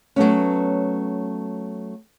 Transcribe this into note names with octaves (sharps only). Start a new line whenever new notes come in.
F#3 A3 B3 C#4